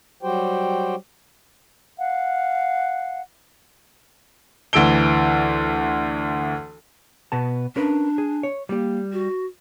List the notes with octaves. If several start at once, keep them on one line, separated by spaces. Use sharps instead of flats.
F#3 G3 F#4 G4 C5 G5
F5 F#5
D2 E3 E6 D7 G7
B2 B3 A5
C#4 D4 A#4 B4
G#4
C#5
G3 A#3 G4
F#4